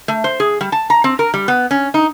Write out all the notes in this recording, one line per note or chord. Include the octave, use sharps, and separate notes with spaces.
A3
C5
G#4
G3
A5
A#5
C4
A#4
G3
B3
C#4
D#4